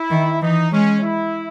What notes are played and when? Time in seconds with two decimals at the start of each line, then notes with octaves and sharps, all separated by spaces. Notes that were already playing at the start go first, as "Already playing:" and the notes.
Already playing: E4
0.10 D#3
0.41 E3 D#4
0.71 G#3 C#4
1.02 E4